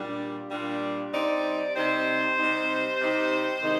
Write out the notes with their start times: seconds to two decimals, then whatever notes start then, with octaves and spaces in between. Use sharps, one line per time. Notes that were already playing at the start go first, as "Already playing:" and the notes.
Already playing: A#2 G3 D4
0.51 A#2 G3 D4
1.13 C3 G3 C4 D#4 D5
1.75 C3 G3 C4 D#4 C5
2.37 C3 G3 C4 D#4
3.00 C3 G3 C4 D#4
3.61 C3 D#3 G#3 D#4